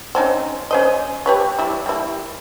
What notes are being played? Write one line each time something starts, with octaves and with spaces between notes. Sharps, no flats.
C4 C#4 D#4
C#4 C5 D#5
G4 B4 C#5
G3 E4
G3 A#3 E4